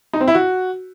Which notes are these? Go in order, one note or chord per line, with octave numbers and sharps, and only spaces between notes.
D#4
C4
E4
F#4